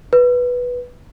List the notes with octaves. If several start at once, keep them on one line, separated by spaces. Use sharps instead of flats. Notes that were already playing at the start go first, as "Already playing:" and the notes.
B4